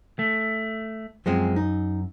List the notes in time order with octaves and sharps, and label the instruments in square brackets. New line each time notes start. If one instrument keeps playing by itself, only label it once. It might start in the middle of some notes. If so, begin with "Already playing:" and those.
[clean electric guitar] A3
[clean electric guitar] F#2 [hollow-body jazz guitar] F3 G#3 C4
[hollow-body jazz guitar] D#4